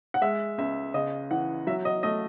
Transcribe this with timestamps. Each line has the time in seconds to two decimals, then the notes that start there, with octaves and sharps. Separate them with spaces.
0.14 F#5
0.22 G#3 E5
0.58 C#2 E5
0.94 C#3 D#5
1.31 E3 F#5
1.67 F#3 E5
1.85 D#5
2.03 A3 D#5